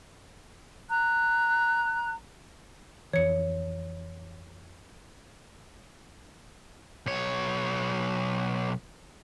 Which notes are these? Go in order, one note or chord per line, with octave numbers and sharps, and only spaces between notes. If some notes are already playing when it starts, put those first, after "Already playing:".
A#5 F#6
F2 E3 C#5 C#7
B1 C#5